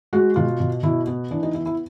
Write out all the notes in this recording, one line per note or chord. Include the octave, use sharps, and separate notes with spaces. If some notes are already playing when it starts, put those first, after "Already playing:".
G#3 F#4
B2 F4
B2
B2 E4
B3
E3 D4
D#4
B3 E4
E4